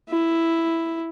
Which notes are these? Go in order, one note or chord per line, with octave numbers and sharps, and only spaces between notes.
E4